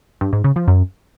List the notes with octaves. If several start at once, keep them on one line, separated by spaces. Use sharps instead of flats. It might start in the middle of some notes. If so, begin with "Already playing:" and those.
G2
G#2
C#3
F3
F#2